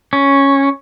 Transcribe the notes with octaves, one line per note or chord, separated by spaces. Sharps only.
C#4